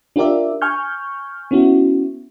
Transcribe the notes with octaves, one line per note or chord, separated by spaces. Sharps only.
D4 F4 G4 A#4 D5 E5
G#5 C#6 F6 G6
B3 C#4 E4 F#4